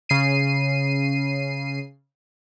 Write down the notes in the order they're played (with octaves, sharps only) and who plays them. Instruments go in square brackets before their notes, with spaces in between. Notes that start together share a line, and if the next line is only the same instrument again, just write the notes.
[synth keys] C#3 C7 D#7